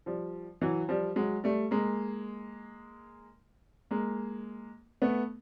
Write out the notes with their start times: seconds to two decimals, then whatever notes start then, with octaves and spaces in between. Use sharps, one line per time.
0.06 F3 G3
0.61 E3 F#3
0.89 F3 G3
1.16 F#3 G#3
1.44 G3 A3
1.71 G#3 A#3
3.91 G#3 A#3
5.02 A3 B3